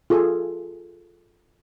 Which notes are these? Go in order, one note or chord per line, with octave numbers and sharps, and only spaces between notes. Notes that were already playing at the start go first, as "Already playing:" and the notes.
F4 G#4 A4